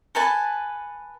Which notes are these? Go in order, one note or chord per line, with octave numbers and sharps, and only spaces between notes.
A4 B4 G#5 A5